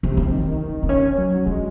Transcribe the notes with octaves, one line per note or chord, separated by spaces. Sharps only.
C3 A#3
C4
D#3
C4
C#4
F#3
G#3 D#4